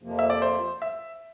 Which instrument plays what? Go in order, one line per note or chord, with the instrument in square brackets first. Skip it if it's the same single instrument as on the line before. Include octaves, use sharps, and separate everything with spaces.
[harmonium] F2 C3 F3 A#3
[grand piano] E5
D5
C5
E5